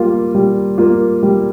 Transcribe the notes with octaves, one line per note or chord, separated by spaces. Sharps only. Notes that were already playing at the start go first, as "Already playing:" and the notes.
Already playing: G3 A#3 F4
G3
A#3 F4
G3